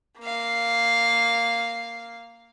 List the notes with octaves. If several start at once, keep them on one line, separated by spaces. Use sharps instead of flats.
A#3 F5